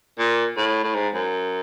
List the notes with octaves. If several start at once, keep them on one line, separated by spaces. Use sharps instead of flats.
A#2
A2
A2
G#2
F#2